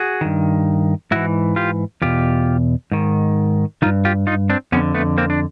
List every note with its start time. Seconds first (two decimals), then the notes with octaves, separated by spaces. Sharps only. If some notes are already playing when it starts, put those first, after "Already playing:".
Already playing: F#4 G#4
0.21 G2 D#3
1.11 G#2 E3 E4 F#4
1.56 F4 G4
2.02 E2 B2 F4 G4
2.92 G#2 D#3
3.82 G2 D#3 D#4 F4
4.05 F4 G4
4.27 D#4 F4
4.50 C4 D4
4.72 F2 D3 B3 C#4
4.94 A3 B3
5.18 A#3 C4
5.30 D4